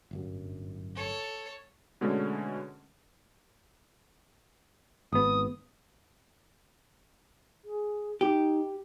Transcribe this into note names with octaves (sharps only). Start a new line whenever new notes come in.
D1 G1 F#2
A4 C#5
B2 D3 G#3 A3 C#4
G#1 B3 D#6
G#4
D#4 G4